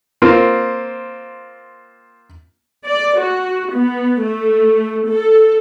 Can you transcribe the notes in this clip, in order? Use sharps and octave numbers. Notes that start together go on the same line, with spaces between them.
A#3 C4 F4
D5
F#4
B3
A3
A4